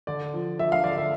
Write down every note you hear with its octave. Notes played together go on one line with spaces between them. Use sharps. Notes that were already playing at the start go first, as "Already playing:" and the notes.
D3 D5
F3
F3 E5
F5
D3 D5
E5